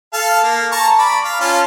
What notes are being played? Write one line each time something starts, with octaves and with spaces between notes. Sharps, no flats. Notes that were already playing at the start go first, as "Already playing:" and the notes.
A4 F5 A5
A#3
A5 A#5 C#6
D5 B5
F5
C#4 F4 A5